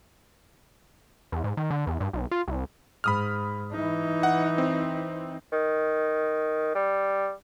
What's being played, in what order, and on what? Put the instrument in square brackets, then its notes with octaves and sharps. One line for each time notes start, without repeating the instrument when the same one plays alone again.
[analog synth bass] E2
G#2
D#3
D3
E2
G2
B1
F4
C2
[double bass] G#2 [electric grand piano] B5 D#6 F6
[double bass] E3 D#4
[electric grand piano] F#5
C4
[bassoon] D#3
G3